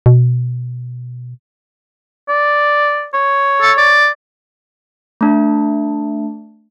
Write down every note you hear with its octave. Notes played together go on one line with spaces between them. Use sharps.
B2
D5
C#5
A4
D5
A3 D4